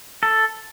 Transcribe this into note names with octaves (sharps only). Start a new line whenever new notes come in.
A4